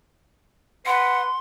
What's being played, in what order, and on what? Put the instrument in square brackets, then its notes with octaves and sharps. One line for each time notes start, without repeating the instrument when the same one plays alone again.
[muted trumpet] B4 [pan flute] F#5 [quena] C6